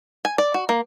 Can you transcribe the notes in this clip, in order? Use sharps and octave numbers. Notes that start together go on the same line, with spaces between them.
G#5
D5
F#4
A#3